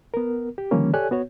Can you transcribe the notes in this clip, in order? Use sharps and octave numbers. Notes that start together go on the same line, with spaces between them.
B3 A#4
G4
D3 D#3 F3 G3 A#3 C#4
G4 A4 C#5 D5 G#5 F#6
B3 F#4 C#5